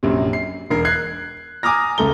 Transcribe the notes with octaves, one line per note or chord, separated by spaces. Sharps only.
A#1 F#2 C3
C7
E1 A#4 C7
F#6 G#6 C7
G#5 A#5 D6 D#6 F6 A#6
C#2 A3 A4 A#5 G7